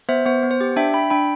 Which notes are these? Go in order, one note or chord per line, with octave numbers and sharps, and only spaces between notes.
B3 C5 E5
B3 C5
B3
C5
G4
D4 E5 G5
D4 G5 B5
D4 G5 B5